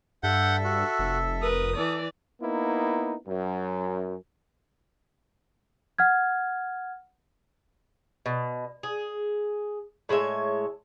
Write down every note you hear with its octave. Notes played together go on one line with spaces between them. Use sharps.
G2 A4 E5 F#5 G6
F#4
F1
A#4 B4 D#6
E3 A4 D5
A#3 B3 D#4 E4
F#2
F#5 F6 G#6
B2
G#4
A2 G#3 C#5 E5